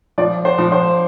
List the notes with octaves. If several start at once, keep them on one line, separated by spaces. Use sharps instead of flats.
F3 D5
C5
F3
C5